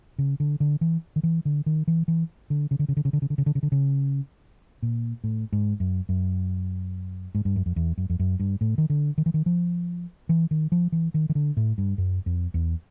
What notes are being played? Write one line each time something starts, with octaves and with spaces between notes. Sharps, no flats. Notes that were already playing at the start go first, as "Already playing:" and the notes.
C#3
D3
D3
E3
D#3
E3
D3
D#3
E3
E3
D3
C#3
D3
C#3
D3
C#3
D3
C#3
D3
C#3
D3
C#3
D3
C#3
A#2
A2
G#2
F#2
F#2
G#2
G2
F#2
F2
E2
F#2
F2
F#2
G2
A2
D#3
D3
D#3
E3
D#3
F3
E3
D#3
F3
E3
D#3
D#3
D3
A2
G2
F#2
F2
E2